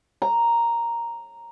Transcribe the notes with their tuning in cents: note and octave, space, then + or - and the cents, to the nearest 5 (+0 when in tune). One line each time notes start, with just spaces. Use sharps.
A#5 +0